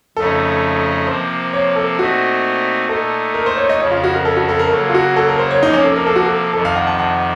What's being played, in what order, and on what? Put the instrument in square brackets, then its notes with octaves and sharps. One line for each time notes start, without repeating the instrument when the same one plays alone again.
[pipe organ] F2 C#3 A3 D#4 [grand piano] A4
[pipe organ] C3 F3 A#3 [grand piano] C5
[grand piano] C#5
A4
[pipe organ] A#2 A3 C4 D#4 [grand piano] F#4
[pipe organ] A#2 A3 D#4 [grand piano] A4
[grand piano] A#4
C5
C#5
D#5
[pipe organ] F2 C#3 F3 [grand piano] C#5
[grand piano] F4
F#4
A#4
A4
F#4
A4
A#4
[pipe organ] C#3 F#3 A#3 [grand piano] A4
[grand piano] F4
F#4
A4
A#4
C5
C#5
[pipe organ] C3 F3 A#3 [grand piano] D#4
[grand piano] C#4
A4
A#4
A4
F#4
A4
[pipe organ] F2 C3 D#3 [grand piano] A4
[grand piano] F5
F#5
A5
F#5